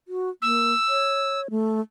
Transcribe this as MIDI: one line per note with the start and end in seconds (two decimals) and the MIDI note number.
0.08 0.30 66
0.42 0.73 58
0.42 1.41 88
0.88 1.48 73
1.50 1.81 57